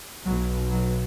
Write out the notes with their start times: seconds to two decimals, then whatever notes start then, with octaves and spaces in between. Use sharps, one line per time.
0.24 B1 B2 F#3
0.71 F#3